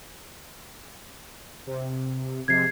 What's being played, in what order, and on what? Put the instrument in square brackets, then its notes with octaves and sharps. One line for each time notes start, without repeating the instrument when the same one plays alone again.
[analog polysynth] C3
[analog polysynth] C3 F3 G#3 [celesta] G#6 C7